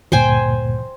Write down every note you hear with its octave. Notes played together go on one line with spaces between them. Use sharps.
D2 G2 A#2 C5 G5 G#5